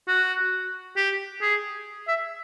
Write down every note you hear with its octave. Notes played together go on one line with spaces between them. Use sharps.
F#4
G4
G#4
E5